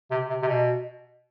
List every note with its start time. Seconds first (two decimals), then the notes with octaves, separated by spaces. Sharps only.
0.11 C3
0.30 C3
0.43 C3
0.48 B2